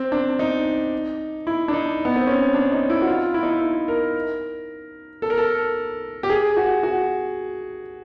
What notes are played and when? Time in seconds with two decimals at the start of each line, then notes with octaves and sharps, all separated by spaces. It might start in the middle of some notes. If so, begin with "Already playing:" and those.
Already playing: C4
0.12 D4
0.39 D#4
1.47 E4
1.68 D4
1.73 D#4
2.05 B3
2.16 C4
2.27 C#4
2.54 D4
2.72 D#4
2.90 E4
3.02 F#4
3.08 F4
3.34 E4
3.43 D#4
3.51 E4
3.61 E4
3.88 A#4
5.22 A4
5.30 A#4
5.38 A4
6.23 G4
6.30 G#4
6.57 F#4
6.83 F#4